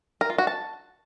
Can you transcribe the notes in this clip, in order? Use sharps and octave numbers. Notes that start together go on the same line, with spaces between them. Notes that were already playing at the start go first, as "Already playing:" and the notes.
A#4
F4
F#4
A5